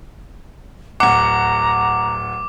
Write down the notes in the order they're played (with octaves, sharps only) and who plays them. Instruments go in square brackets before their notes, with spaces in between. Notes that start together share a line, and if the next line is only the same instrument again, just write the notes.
[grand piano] D1 F#5 [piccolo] A#5 [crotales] D6